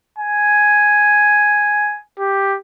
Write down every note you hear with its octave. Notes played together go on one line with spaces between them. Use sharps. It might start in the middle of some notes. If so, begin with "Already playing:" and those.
G#5
G4